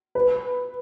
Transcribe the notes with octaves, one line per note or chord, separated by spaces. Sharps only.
B4